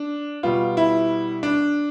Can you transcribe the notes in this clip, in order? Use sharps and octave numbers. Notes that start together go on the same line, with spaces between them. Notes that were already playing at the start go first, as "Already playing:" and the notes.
Already playing: D4
B2 G3 B3 F4
E4
D4